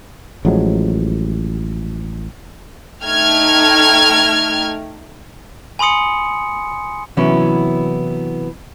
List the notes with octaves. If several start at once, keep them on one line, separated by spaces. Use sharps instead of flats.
A1 F3 F#3 G#3
A3 D#4 G5 F6 G#6
G#5 B5 C6 D#6 C#7
C3 E3 F#3 B3 C#4 E4